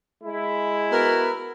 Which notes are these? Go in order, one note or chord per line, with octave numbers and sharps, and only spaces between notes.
G#3 E4
B3 F#4 A#4